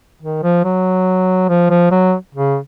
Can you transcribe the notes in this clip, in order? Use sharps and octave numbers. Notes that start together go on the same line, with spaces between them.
D#3
F3
F#3
F3
F3
F#3
C#3